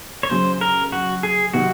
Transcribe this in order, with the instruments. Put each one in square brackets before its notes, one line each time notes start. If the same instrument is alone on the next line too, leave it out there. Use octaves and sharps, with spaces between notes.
[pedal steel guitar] C#5
[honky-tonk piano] F#2 C#3 F#3 [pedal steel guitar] C5
[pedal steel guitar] A#4
F#4
G#4
[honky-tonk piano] C3 D#3 F#3 [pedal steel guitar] F#4